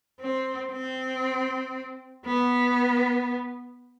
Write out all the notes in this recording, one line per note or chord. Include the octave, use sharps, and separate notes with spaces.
C4
C4
B3